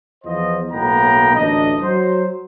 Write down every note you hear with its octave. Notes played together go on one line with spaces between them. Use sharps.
E2 F3 B3 C5 D#5
B1 A2 A#3 B3 G5 A#5
A1 D2 D4 D#4 D#5
F#3 C5